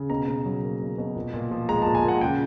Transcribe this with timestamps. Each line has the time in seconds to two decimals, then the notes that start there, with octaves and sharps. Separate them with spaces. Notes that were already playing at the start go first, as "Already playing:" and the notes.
Already playing: C#3
0.10 B2 A#5
0.28 B2
0.45 F#3
0.63 A#3
0.81 B2
0.98 B2
1.16 A#2
1.34 A#2
1.51 F3
1.69 G#3 A#5
1.82 A5
1.86 A#2
1.95 G#5
2.04 A#2 F#5
2.21 C#3 G5